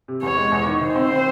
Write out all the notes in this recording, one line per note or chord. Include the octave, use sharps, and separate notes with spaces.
C3
E2 C#5
G#3
E2
D#3
D#3 C5
C4
C4